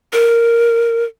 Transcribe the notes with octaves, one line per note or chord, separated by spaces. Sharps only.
A#4